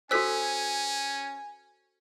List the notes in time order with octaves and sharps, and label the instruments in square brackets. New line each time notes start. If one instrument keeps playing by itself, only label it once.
[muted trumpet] C#4 [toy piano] F#4 A4 C5 [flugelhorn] G#5 [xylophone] E6 B6